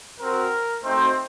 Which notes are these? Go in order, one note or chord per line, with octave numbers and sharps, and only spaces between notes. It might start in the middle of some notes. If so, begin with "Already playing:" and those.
C4 F#4 A#4
A3 C4 D#4 F#4 C5